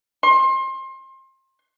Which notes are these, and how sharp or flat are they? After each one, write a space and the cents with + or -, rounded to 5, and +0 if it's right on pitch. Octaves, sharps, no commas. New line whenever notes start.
C6 +30